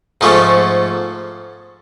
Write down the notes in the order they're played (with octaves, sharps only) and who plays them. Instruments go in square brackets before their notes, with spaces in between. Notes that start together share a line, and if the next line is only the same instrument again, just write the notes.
[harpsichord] G#2 F3 A3 C#4